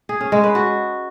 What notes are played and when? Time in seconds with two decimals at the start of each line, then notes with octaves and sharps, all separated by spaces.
0.09 G#4
0.21 C#4
0.32 G#3
0.44 B4
0.55 F#4